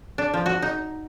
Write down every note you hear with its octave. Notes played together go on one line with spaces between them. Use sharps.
D4
F3
F#4
D#4